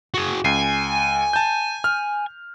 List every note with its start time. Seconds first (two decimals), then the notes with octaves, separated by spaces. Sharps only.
0.14 F#4 G#4
0.45 C#2 G#5 C7
1.33 A5 G6
1.84 F6